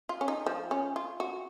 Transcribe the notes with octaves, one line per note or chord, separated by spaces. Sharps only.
F4
C#4
D#4
F3
C#4
F4
F#4